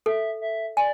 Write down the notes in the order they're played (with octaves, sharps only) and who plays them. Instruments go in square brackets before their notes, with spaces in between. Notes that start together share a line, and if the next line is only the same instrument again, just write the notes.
[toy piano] A4 [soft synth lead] E5
[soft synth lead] E5
[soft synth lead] D5 [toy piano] G#5